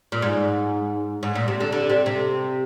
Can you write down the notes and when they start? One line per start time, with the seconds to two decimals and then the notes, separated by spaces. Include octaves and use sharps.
0.12 A#2
0.22 G#2
1.23 G#2
1.35 A#2
1.48 C3
1.60 D3
1.72 D3
1.90 C3
2.06 C3